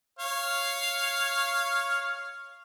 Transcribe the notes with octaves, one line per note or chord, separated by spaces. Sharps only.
C#5 F5